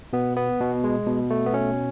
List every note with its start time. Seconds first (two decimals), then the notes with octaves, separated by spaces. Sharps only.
0.13 B2 B3
0.37 B3
0.60 B2
0.84 G#3
1.07 B2
1.30 A3
1.46 B3
1.53 B2 C#4